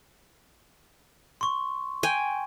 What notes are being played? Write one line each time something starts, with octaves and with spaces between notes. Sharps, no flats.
C6 C#6
G5 G#5